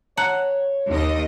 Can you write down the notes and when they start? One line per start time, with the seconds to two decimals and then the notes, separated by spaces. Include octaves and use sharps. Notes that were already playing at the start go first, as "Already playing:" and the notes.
0.17 C#5 F#5 A5 A#5 F#6
0.88 D#2 D#5